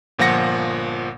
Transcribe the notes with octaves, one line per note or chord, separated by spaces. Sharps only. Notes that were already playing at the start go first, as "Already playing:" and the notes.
G1 A#2 F3 F#5 A#6 C#7